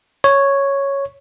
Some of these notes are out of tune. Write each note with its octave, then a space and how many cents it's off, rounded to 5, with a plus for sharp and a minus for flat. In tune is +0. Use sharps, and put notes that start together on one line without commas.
C#5 +0